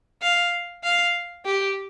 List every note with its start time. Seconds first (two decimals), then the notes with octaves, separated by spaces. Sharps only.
0.22 F5
0.84 F5
1.45 G4